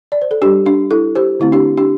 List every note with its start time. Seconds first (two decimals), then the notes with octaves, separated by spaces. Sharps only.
0.12 D5
0.22 C5
0.31 A4
0.42 G3 D4 G4
0.66 D4 G4
0.91 E4 A4
1.15 G4 C5
1.40 D3 A3 C4 E4
1.52 D4 G4
1.77 D4 G4